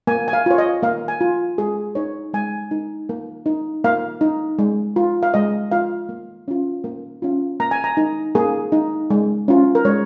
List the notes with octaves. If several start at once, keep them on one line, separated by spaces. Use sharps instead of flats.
A#3 G#5
G#5
F5
F4 C#5
D#5
A#3 F5
G#5
F4
G#3 G#4
D#4 C#5
G#3 G#5
D#4
A#3
D#4
A#3 F5
D#4
G#3
F4
F5
G#3 D#5
F4 F5
A#3
C#4 F4
A#3
C#4 F4
A#3 A#5
G#5
A#5
D#4
A#3 G#4
D#4
G#3
C#4 F4
A#4
G#3 C#5